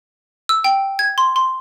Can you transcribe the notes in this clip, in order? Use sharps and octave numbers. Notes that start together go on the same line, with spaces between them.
E6
G5
G#6
C6
C6